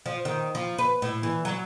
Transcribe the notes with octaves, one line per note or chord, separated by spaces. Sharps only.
F3
D#3
F3
B4
A2
E3
F#3